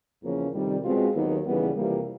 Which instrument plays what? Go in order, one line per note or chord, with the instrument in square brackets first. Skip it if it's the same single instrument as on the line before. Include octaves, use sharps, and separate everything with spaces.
[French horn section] E2 C#3 F3 A#3 C#4
F2 C3 D#3 G3
B2 G#3 C4 F4
D#2 D#3 F#3 B3 D#4
D#2 C#3 E3 G3 B3
F2 C3 E3 G3 A#3